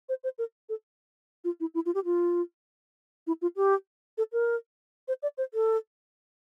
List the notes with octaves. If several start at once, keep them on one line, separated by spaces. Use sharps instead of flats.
C5
C5
A#4
A4
F4
E4
E4
F4
G4
F4
E4
F4
G4
A4
A#4
C5
D5
C5
A4